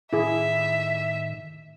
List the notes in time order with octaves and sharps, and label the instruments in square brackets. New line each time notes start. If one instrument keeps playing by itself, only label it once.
[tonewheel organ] A2 D#3 [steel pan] E4 G#4 [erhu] E5